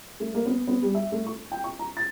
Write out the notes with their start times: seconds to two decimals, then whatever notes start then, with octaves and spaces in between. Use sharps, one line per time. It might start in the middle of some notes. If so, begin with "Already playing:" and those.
0.20 A3
0.34 A#3
0.46 B3
0.67 B3
0.82 G3
0.95 E5
1.12 A3
1.27 C#6
1.52 G5
1.64 C#6
1.79 A#5
1.97 A6